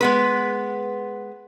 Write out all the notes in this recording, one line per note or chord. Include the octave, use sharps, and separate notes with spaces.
G#3 B3 B4